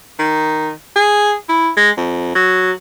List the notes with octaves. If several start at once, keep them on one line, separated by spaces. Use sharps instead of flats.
D#3
G#4
E4
G#3
F2
F#3